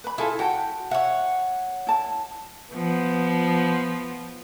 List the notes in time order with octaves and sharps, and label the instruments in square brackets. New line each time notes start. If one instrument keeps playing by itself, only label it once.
[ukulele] B4 B5
[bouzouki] E4 [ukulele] F4 G#4 A4
[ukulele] F#4 F#5 A5 [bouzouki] G5
[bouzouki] C#5 F#5 [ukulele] E5
[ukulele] E4 A5
[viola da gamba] F3 B3